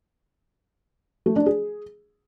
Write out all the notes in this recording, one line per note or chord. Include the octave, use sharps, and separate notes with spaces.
A3
D4
G#4